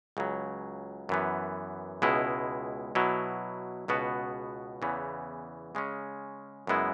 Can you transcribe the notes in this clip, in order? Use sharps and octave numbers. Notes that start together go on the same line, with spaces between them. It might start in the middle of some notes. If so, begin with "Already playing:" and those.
C#2 C#3 F#3
F#2 E3 B3
C#2 B2 G#3 E4
B2 F#3 E4
C#2 B2 B3 F#4
E2 C#3 E3 B3
C#3 G#3 C#4
F#2 C#3 G#3 B3 E4